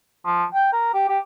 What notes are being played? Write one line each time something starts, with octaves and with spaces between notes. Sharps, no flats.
F3
G5
A#4
G4
G4